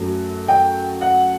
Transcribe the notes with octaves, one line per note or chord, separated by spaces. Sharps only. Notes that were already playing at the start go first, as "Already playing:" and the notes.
Already playing: F#2 F#3 A3
G5
F#5